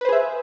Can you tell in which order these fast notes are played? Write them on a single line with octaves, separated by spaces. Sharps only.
B4 C5 G#4 E5